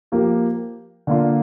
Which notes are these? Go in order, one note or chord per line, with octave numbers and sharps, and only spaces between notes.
F3 A#3 G4 A#4
D3 A#3 F4